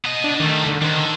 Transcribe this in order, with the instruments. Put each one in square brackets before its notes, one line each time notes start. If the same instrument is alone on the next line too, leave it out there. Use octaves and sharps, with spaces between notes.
[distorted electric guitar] B3 D#5
[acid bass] D4
[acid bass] D#3 [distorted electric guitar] G3 A3
[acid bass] D3
[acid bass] D#3 [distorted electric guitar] D4 C5
[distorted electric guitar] D3